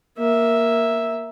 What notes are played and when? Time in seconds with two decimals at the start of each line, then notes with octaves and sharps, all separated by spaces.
0.18 A#3 E5